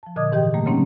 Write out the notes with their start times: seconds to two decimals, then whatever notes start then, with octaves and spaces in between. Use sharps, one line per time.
0.03 F3 A5
0.16 A#2 D3 D#5 D6 D#6 G#6
0.32 G#2 E3 G4 D#5 G5
0.54 A#2 G3 A3 A#3
0.66 C#3 F#3 A#3 C4 C#4 D#4